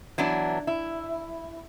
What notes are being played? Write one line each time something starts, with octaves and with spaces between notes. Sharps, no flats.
E3 F#3 B3 D4
E4